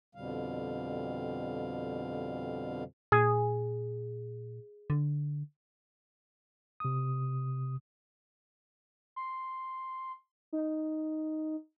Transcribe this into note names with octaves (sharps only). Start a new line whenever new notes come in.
F2 B2 D3 G3 F5
A#2 G#4
D3
C3 D#6
C6
D#4